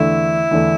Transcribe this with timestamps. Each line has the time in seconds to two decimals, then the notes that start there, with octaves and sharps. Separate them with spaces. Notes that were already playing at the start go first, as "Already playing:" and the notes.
Already playing: E2 D3 A3 D4 E4
0.51 E2 D3 A3 D4